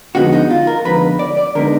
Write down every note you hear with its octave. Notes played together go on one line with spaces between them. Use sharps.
F2 D3 G#3 B3 D#4 F#4
D#4
F4
A#4
F2 D3 G#3 B3 D#4 B4
D5
D5
D3 G#3 B3 D#4 A#4